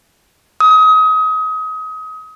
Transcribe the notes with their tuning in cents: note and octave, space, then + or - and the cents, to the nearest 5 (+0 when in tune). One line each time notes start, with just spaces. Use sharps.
D#6 +30